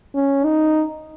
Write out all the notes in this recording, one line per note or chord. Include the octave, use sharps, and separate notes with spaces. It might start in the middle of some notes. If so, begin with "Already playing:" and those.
C#4
D#4